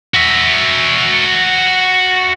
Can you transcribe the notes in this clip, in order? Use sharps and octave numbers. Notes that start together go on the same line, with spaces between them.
F#4 E5